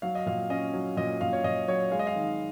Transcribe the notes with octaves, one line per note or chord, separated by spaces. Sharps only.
F#3 F5
D#5
A#2 F5
C#4 D#5
F#3
A#2 D#5
A#2 F5
C#5
A#2 D#5
F#3 C#5
G#3 F5
D#5
F5
D#3